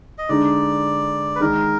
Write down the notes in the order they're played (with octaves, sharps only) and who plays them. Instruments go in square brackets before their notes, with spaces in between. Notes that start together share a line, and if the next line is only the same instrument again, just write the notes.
[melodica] D#5
[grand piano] D3 G#3 D#4 [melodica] D5
[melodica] B4
[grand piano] D#3 G#3 D#4 [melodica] A#4